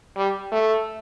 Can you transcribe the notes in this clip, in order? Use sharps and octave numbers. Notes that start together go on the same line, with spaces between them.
G3
A3